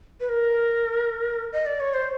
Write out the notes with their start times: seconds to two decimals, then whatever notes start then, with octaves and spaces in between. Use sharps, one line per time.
0.20 B4
0.29 A#4
1.53 D#5
1.66 D5
1.80 C#5
1.94 C5